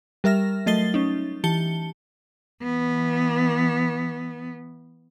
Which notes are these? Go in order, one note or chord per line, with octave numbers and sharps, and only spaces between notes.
G3 A#4 E5 F6 A#6
F#3 A3 D#5 A6 C7 G7
C#4 D#4
E3 G4 A5 C#7 G7
E3 B3